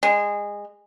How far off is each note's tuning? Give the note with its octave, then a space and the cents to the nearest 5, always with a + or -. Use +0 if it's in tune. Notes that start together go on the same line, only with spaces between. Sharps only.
G#3 -20